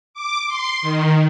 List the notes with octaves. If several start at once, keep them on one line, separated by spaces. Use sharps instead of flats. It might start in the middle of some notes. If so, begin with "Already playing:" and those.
D6
C6
D#3